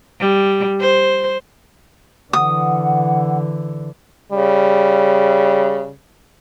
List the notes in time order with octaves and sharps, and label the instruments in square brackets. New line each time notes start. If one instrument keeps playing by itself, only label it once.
[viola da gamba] G3
C5
[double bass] D3 E3 [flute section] F#5 [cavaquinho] D#6
[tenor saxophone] C#3 [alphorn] G3